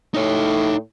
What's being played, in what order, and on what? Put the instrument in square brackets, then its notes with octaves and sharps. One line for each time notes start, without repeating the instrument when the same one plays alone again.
[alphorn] A2 [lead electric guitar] D#4 C#5